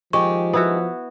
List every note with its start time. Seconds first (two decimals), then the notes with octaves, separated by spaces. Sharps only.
0.13 D#3 F3 G#3 G4 C#6
0.53 B3 E4 F#4